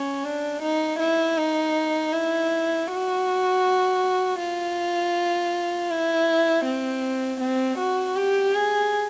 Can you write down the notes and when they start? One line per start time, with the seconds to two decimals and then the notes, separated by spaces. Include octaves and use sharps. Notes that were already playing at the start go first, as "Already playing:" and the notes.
Already playing: C#4
0.24 D4
0.62 D#4
0.99 E4
1.37 D#4
2.13 E4
2.88 F#4
4.39 F4
5.91 E4
6.65 C4
7.40 C4
7.78 F#4
8.16 G4
8.54 G#4